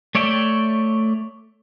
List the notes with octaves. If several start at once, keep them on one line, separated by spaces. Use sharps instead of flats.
A3 C#5 D5 E5 G5